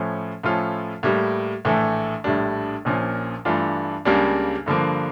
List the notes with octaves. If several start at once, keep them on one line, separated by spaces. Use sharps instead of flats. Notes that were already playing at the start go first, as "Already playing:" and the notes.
Already playing: A2 F3 C#4
A2 F3 C#4 F4 A4
A2 G3 A#3
A#1 A2 E3 A3
A#1 A2 G3 D4
A#1 A#2 F3 C#4
G2 E3 A3 D4 F4
C#2 C#3 G3 A#3 D4
G2 D3 F3 A#3